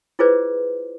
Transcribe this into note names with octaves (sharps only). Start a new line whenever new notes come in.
E4 F4 G#4 B4 C5 D5